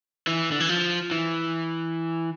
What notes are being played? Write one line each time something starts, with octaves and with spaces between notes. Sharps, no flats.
E3
D3
E3
F3
E3